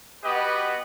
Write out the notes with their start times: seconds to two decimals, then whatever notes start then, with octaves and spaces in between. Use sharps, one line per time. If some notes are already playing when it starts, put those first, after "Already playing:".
0.24 B3 F#4 G4 B4 D#5